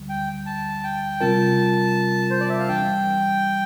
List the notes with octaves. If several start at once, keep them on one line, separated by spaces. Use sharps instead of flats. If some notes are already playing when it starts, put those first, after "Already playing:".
Already playing: D2 D3 G3
G5
A5
G5
C3 G3 C4 F4 A#4 A5
C5
D5
E5
F5
E3 G3 D4 G5